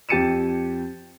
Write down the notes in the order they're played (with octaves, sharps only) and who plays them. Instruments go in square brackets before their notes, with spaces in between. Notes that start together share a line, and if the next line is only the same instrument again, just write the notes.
[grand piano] F2 G4 A6 C#7 D#7 E7